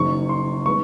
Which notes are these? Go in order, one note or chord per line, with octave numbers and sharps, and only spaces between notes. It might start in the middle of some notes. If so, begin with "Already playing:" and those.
Already playing: F#1 F#2 D#3 C#6
C6
D#3 G#3 B3 C#6